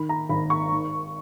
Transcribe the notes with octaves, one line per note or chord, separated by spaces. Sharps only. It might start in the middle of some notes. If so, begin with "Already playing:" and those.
Already playing: D#3 B5
A#5
G#1 B5
C#6
D#3